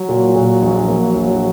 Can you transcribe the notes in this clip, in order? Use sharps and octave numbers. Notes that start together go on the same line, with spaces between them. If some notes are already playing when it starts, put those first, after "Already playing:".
Already playing: F#3
A#2
A#2
A#1
A#3
A#1